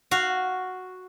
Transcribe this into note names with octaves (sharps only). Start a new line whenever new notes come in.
F#4 F5